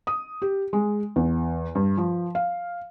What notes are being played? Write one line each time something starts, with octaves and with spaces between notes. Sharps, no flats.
D#6
G4
G#3
E2
G2
F3
F5